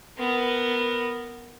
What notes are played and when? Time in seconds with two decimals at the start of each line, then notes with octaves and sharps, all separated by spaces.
0.17 B3 A#4